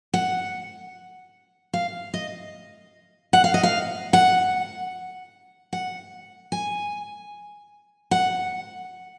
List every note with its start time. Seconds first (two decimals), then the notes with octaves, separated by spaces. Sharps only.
0.14 F#5
1.73 F5
2.14 D#5
3.33 F#5
3.44 F5
3.54 D#5
3.63 F5
4.13 F#5
5.73 F#5
6.52 G#5
8.11 F#5